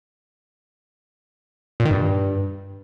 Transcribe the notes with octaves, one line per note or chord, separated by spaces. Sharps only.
A#2
D#3
G2